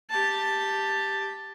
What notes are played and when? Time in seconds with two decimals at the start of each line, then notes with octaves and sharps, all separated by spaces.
0.10 G4 A5